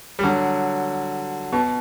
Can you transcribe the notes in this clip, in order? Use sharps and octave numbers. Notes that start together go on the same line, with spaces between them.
G3
D3 F#3
B2